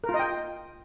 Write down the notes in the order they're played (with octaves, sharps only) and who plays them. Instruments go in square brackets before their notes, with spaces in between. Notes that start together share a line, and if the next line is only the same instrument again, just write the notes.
[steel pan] A#4
F4
D#5
G5